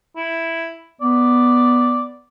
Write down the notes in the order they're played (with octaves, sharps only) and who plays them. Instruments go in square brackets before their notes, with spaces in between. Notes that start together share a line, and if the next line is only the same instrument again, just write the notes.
[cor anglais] E4
[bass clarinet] B3 [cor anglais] D5